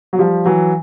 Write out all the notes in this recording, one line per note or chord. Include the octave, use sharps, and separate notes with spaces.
F#3
F3 G3
E3 F#3